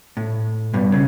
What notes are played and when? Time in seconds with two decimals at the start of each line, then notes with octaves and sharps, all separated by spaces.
0.17 A2
0.74 G2 B2
0.92 C#3